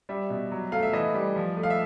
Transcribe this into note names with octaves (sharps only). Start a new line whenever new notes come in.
G3 E5
B2
F#3
A3 F5
E5
E3 D#5
G3
F3
A3
F5
E5